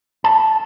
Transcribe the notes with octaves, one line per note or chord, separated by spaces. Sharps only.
A5